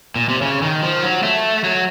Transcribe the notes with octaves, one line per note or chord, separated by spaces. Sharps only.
A#2
C3
C#3
D#3
F3
F#3
A3
F#3